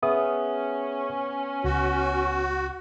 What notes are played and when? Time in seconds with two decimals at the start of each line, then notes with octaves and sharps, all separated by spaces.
0.03 B3 C#4 G#4 E5 D#6
1.64 C#2 F#4